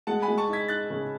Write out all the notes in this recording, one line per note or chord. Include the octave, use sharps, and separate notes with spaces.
G#3 F#5 A5
G#5 B5
G#3
A5 C#6
D#4
G#6 B6
D#4 F#6 A6
C#3